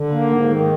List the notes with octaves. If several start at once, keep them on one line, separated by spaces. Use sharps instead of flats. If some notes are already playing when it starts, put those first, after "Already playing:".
Already playing: D3
A#3
G#2
D#3